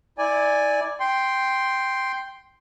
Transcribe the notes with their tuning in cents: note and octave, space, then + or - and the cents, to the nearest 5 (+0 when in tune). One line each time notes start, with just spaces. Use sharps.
E4 -30 D5 +0 G#5 -5
G5 +0 C6 +0